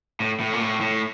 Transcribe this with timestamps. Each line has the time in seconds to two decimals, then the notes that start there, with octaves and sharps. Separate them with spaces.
0.20 A2
0.40 A2
0.53 A#2
0.61 A2
0.81 A2